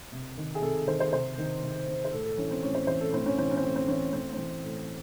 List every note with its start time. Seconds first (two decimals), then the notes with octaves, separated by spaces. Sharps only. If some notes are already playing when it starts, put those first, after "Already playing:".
0.12 C3
0.37 D#3
0.55 G#4
0.62 C3 A4
0.87 D#3 C5
1.00 C5
1.12 C3 C5
1.38 D#3
1.63 C3
1.88 D#3
2.05 C5
2.12 A2 A4
2.25 A4
2.37 E3 C#4
2.51 C4
2.63 A2 C#4
2.75 C5
2.87 E3 C5
3.01 A4
3.12 A2 C4
3.26 C#4
3.38 E3 C4
3.51 C#4
3.57 C4
3.63 A2 C#4
3.76 C4
3.88 E3 C#4
4.13 A2 C4
4.33 C4
4.38 E3
4.64 A2